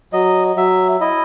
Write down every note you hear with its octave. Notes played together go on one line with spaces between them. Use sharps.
F#3 D#5
F#3 E5
E4 D#5